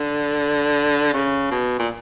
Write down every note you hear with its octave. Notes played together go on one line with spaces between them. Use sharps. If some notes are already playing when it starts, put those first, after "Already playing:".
Already playing: D3
C#3
B2
A#2